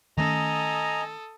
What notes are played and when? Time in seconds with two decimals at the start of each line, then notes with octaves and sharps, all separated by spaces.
0.18 D#3 A3 C#4 A4 D#5 G#5 A#5 D#6